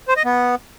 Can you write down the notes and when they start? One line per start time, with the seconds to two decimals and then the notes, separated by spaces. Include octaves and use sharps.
0.08 C5
0.16 D#5
0.25 B3